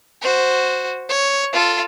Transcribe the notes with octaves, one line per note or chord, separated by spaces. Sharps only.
F#4 C5
C#5
F4 A4